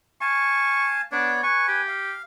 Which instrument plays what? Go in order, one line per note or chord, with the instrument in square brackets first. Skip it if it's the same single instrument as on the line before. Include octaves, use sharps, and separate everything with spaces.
[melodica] F5 G#5 A5 [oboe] C#6
[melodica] B3 C#5 D5 [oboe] D4
[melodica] B4 G#5 [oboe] C#6
[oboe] G4
[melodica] F5